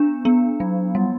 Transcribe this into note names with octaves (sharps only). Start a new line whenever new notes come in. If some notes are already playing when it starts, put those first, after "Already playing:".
Already playing: B3 D4
B3
F#3
G3